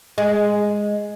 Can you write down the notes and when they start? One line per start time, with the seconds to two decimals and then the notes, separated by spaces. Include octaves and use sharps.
0.18 G#3